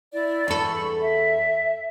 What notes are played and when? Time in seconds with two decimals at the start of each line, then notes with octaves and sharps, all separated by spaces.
0.13 E4 D5
0.48 E2 A4 B5 C#6
1.00 E5